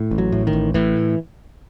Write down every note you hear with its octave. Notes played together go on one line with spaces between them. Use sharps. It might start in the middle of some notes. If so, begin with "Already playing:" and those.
Already playing: A2
A1
F#3
A2
D#3
A1
A2 E3